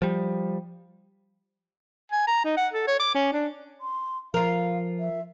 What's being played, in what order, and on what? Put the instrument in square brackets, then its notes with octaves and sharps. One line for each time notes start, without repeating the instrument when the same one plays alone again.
[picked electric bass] F3 G3
[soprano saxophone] G#5
A#5
D#4
F#5
A4
C#5
D6
C#4
D4
[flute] C6
[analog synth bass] F3 [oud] F4 A#4 [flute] F5
[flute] E5